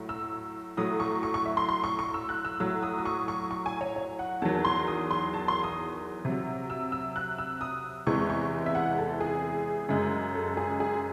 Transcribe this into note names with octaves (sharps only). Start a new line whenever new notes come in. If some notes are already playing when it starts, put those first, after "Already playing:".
Already playing: A2 F#3
E6
A2 F#3 D#6
C#6
C#6
C#6
E5
C6
C6
C#6
C#6
E6
F#6
E6
A2 F#3 E6
D#6
D#6
C#6
C#6
C#6
G#5
C#5
C#5
F#5
E2 D#3 F#3 A5
C6
D#6
C6
A5
C6
D#6
C3 F#3
E6
E6
F#6
E6
D#6
E2 C3 E3 G#3 C#6
C#6
E5
F#5
A4
G#4
F#2 C#3 G#3
A4
G#4
G#4